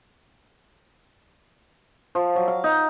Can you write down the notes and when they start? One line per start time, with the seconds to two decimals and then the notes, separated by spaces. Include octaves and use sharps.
2.15 F3
2.36 F#3
2.48 F5
2.64 D#4